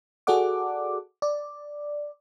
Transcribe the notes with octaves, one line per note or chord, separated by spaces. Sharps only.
F#4 G#4 A4 D5 F#5 D6
D5